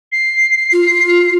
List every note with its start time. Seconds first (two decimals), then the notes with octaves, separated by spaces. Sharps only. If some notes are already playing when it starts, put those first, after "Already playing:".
0.12 C7
0.73 F4